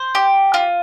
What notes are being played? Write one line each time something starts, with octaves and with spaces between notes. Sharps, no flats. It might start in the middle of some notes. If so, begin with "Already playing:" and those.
Already playing: C5
G4
F4